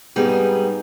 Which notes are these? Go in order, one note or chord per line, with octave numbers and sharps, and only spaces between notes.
G#2 G3 B3 C4 D#4 G#4